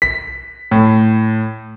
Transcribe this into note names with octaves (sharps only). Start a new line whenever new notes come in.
B6
A2